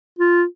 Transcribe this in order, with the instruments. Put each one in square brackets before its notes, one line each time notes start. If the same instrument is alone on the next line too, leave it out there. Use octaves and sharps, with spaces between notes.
[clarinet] F4